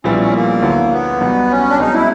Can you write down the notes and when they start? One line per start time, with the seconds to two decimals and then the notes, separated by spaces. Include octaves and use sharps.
0.04 A#1 A#2 G3 B3 C#4 E4
0.19 C#4
0.33 A#3
0.62 D2 D3 F#3 B3 E4
0.91 B3
1.21 B1 B2 G3
1.50 C#4
1.70 D4
1.79 C2 B2 G#3 D#4
1.94 E4